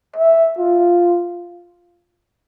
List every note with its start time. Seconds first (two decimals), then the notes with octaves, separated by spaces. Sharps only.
0.16 E5
0.58 F4